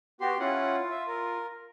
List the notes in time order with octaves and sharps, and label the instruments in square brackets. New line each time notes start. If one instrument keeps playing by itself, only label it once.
[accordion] B3 F#4 [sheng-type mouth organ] G4 C6
[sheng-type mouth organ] C#4 E4 F#5 [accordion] F4
[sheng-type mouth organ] E5
A#4